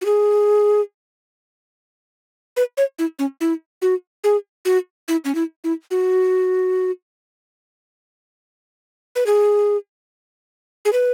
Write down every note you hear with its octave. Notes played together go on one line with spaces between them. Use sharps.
F#4
G#4
B4
C#5
E4
C#4
E4
F#4
G#4
F#4
E4
C#4
E4
E4
F#4
B4
G#4
G#4
B4